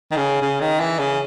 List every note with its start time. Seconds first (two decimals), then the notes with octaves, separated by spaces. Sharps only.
0.11 D#3
0.17 C#3
0.42 C#3
0.61 D#3
0.80 E3
0.99 C#3